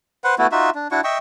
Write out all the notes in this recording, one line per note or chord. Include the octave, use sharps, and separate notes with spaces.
B4 C5 F#5
A3 B3 E4 F#4
D#4 F4 F#4 E5
D4
D4 E4 F#4 C#6
D#5 E5 G5 C#6